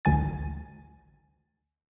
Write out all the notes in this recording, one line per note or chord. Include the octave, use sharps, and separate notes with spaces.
A1 D2 D3 G#5 A6